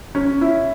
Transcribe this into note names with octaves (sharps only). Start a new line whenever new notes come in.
C#4
E4